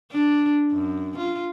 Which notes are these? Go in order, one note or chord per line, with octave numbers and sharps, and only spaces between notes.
D4
F#2
F4